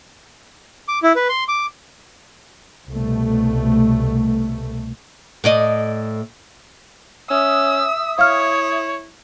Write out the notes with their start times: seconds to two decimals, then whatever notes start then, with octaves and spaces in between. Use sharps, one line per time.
0.88 D6
1.03 E4
1.16 B4
1.29 C6
1.48 D6
2.89 C2 B2 A3
5.44 A2 D5 D#5
7.30 C#4 E5 D#6 E6
8.19 E4 C#5 F5 F6